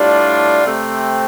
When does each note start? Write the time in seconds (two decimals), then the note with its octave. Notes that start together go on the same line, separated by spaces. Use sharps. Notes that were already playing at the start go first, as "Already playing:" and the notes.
Already playing: A2 G3 D4 F4
0.63 C3 A3 C4